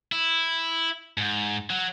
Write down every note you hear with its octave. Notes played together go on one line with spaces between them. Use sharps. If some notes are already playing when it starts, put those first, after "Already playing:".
E4
G#2
F#3